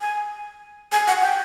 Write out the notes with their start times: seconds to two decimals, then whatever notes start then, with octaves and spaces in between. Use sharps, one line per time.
0.01 G#5
0.92 G#5
1.07 F#5
1.22 G5